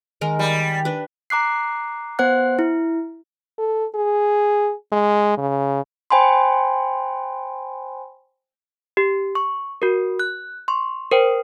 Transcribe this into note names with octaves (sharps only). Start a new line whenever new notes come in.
D#3 G#3 A#4 D#5
G3
D4 B4
A#5 D6 F#6 C7
B3 C5 F#5 F#6
E4
A4
G#4
G#3
C#3
C5 G5 G#5 B5 C6
G4
C#6
F#4 A#4
F#6
C6 C#6
A#4 C5 G5